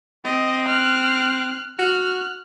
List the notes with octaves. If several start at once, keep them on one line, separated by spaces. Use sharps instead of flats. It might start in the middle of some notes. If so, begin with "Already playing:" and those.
C4 D#5
F6 F#6
F#4 F6 F#6